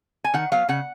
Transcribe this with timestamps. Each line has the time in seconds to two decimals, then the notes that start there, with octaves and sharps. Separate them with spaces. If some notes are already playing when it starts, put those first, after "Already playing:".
0.24 G#5
0.34 D#3 F#5
0.52 F#3 B3 F5
0.69 C#3 F#5